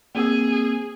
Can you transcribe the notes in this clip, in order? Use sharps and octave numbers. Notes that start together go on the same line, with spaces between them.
A#3 C4 G#4 E6